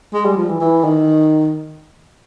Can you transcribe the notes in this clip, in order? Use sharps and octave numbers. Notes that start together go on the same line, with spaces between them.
G#3
G3
F3
E3
E3
D#3